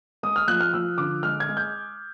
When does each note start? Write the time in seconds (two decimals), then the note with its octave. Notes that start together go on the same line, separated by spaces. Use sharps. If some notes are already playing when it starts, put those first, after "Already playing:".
0.23 G#3 D#6
0.36 F6
0.48 F3 F#6
0.61 F6
0.74 F3 E6
0.98 D3 D6
1.23 G#3 F6
1.40 G#6
1.49 G#3
1.57 G6